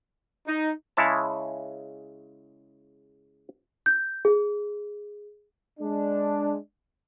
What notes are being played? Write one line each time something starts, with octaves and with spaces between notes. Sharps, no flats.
D#4
C#3 G#3 E4 C#5 A5
G6
G#4
G#3 D4